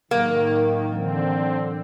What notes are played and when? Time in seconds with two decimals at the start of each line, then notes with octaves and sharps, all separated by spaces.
0.11 A2 D#3 F#3 A#3 A#4
0.92 D3 E3 F#3 C4 D4